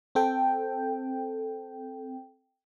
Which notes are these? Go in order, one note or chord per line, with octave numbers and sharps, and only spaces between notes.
C4 A4 G5